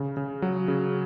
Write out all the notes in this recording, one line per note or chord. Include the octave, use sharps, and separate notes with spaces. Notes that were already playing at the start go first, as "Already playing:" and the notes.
Already playing: C#3
C#3
F#3
C#3